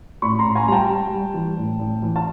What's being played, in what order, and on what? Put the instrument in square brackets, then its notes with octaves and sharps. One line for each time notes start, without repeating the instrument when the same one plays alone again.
[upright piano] A2 B5 C#6
A#5 C6
A2
G#5 A#5
G3 A#5
G5 A5
G3
G3
E3
A2
A2
E3
A5